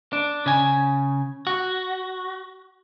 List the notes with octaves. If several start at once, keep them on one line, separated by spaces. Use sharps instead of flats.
D4
C#3 G#5
F#4